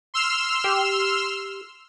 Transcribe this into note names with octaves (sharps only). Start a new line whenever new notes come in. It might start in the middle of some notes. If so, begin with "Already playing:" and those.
C6 E6 F6
G4